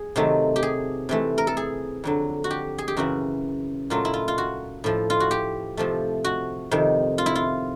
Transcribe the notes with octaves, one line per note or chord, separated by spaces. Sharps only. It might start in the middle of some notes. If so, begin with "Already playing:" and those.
Already playing: G#4
C3 D#3 F#3 A3
G4
G#4
C3 E3 A3
A#4
A4
G#4
F2 D3 F#3
F#4
G4
G#4
G4
F#2 C#3 E3 F#4
A#2 F#3 A3 F4
E4
F4
F4
F#4
A2 F3 A3
F4
F#4
G4
C3 F3 A3
F#4
F2 C3 D#3
F4
E4
F4